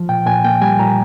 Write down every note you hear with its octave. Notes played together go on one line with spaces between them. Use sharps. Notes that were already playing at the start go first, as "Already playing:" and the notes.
Already playing: F3
A#2 G5
A#2 G#5
A#3 G5
G3 G#5
A#2 A#5